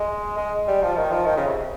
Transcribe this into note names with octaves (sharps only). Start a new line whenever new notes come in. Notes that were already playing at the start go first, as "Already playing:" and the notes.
Already playing: G#3
G#3
G3
F3
D#3
F3
D#3
C#3
C3